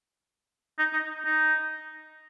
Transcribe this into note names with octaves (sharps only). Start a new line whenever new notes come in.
D#4
D#4
D#4